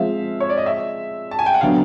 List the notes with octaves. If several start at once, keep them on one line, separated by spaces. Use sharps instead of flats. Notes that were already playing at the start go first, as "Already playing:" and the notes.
Already playing: F3 G#3 C4 E5 F5
C#5
D5
D#5
E5
A5
G#5
G5
F#5
D3 F#3 B3 F5